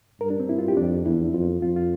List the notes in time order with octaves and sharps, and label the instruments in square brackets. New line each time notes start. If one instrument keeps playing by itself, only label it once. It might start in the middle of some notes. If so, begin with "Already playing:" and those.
[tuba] G2 [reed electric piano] A#4
[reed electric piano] D4
C4
E4
F4
G4
[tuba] F2 [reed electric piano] D4
[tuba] E2 [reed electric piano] E4
[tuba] F2 [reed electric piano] F4
[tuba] F2 [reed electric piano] F4
[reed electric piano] F4